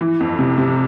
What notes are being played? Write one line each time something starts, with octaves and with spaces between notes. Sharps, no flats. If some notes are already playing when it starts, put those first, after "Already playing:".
E3
F2
C3
C3